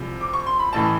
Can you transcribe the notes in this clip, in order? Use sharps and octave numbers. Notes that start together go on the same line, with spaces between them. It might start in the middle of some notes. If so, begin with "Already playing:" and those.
Already playing: C2 C3 F3 G#3
D6
C#6
C6
B5
A1 A2 E3 A5